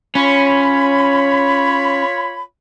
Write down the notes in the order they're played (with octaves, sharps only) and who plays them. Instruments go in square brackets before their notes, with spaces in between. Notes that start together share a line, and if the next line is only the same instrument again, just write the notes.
[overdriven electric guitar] C#4 [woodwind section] F4 C#5 B5